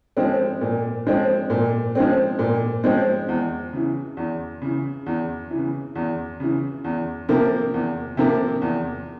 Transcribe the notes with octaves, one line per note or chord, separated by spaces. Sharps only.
F3 G#3 C4
A#2
F3 G#3 C4
A#2
F3 G#3 C4
A#2
F3 G#3 C4
E2
C#3 E3
E2
C#3 E3
E2
C#3 E3
E2
C#3 E3
E2
C3 F3 A#3
E2
C3 F3 A#3
E2